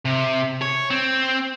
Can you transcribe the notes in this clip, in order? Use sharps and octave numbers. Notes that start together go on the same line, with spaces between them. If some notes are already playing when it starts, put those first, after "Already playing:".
C3
C#5
C4